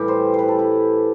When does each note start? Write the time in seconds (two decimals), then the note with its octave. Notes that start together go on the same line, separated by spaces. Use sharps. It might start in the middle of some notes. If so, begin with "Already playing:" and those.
Already playing: A2 E3 G3 G4
0.08 C5
0.34 B4 C5
0.48 A4
0.59 E4